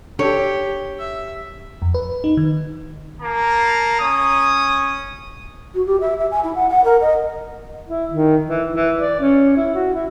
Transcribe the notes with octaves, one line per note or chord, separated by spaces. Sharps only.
D4 G4 A4 C#5 C#6
E5
F2
B4
D#4
D#3
A#3 A5 A#5
C#4 D#6
F#4
G4
E5
E5
G#5
E4
F#5
F#5
A#4
D#5
E4
D#3
E3
E3
D5
C#4
E4
F#4
E4